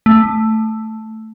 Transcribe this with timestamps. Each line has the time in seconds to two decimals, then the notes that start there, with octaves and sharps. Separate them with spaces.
0.06 A3